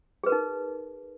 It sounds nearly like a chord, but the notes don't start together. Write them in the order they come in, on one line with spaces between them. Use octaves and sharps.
G#4 B4 A#4 D#4